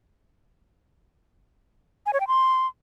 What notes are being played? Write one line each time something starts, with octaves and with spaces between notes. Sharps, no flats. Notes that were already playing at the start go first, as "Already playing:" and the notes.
G#5
C#5
G5
C6